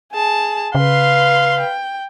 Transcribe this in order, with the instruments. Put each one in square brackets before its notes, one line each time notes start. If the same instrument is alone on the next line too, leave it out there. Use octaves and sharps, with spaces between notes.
[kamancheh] G#4 A5
[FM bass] C#3 [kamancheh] B4 C6 [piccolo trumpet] F5
[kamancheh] G5